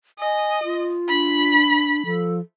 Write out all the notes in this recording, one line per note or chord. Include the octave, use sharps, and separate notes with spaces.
D#5 G#5
F4
D4 B5
F3 A4